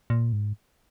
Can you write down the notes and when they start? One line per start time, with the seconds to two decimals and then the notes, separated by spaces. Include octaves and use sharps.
0.10 A#2
0.33 G#2